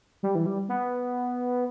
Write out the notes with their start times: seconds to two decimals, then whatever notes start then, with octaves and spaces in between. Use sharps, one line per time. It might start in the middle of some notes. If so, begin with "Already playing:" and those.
0.23 G3
0.35 E3
0.46 G3
0.69 B3